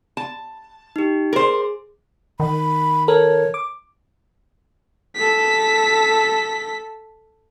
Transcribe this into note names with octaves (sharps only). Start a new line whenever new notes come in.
A5
D#4 G4
G#4 A#4 C5
D#3 B5
A4 A#4 C#5
D6
A4 B6